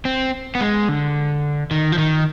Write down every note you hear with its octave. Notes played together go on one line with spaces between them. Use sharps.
C4
B3
G#3
D3
D#3
F3
D#3